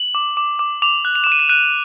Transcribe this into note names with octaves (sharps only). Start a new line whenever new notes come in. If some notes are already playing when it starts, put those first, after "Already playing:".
Already playing: F#7
D6
D6
D6
D6 F7
F#6
F7
D6 E7
D#7
E7
F#6 D#7